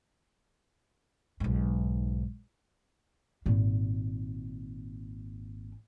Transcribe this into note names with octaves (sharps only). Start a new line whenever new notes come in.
B1 G#2
G#1 A#2